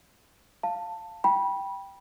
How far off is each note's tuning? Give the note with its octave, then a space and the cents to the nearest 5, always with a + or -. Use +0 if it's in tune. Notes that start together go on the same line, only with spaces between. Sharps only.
F5 +0 A5 +15
G5 +0 B5 -20